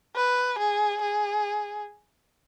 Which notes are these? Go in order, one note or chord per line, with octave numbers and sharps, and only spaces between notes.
B4
G#4
G#4